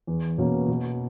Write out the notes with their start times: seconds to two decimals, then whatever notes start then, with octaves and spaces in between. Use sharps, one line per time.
0.07 E2
0.38 B2 A#3 C#4
0.68 B2